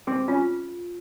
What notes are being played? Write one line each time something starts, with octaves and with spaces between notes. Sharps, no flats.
C4 G#4
C#4 F4